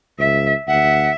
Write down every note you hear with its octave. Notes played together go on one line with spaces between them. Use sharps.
C#2 E5
D2 E5 F#5